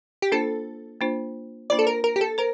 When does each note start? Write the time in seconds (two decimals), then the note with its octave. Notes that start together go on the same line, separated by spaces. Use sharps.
0.22 G4
0.32 A#3 D4 F4 A4 C5
1.01 A#3 D4 F4 C5
1.70 A#3 D4 F4 C5 D5
1.79 A4
1.87 A#4
2.04 A#4
2.16 G4
2.21 A4
2.38 A#4 C5